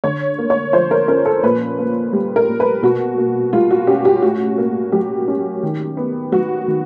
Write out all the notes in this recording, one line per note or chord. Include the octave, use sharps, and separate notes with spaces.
D3 C#5
A#3
C#5
F3 C5
A#4
C#4 A#4
A4
A#2 B4
A#3
G3
A#4
A#2
B4
B2 F#4
A#3
G3 F4
F#4
C#4 G4
G4
A2 F#4
A#3
F#3 G4
C#4
D#3
B3
F#3 F#4
D#3